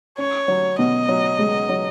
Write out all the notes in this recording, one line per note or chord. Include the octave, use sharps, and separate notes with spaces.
C#4 C#5
F#3
B2 D#5
F#3
C#2
F#3